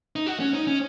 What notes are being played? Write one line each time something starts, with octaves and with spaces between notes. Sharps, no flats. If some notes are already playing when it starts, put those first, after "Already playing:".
D#4
F#4
C#4
D#4
C#4